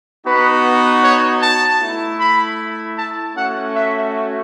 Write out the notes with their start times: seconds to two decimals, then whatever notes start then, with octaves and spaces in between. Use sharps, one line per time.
0.26 B3 D#4 F#4 B4
1.04 C#5
1.42 A5
1.81 A3 E4
2.20 B5
2.98 A5
3.36 A3 C#4 F#4 F#5
3.75 E5